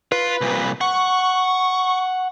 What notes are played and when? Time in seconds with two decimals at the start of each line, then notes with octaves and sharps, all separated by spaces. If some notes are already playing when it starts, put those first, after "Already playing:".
0.12 F4 B4
0.41 C2 A#2
0.81 F#5 C#6